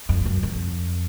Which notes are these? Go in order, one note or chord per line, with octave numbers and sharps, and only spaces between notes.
F2
F#2
F2